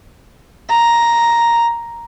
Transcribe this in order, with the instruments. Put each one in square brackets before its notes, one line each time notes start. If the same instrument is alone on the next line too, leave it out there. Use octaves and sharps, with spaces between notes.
[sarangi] A#5